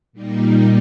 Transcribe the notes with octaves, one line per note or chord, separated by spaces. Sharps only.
A#2 G3 A#3 D#4